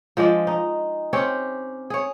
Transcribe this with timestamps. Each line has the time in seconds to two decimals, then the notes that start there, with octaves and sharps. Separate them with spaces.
0.17 F3 G#3 D4 D5
0.47 D#4
1.13 C4 C#4 G4 C#5
1.90 G#4 C#5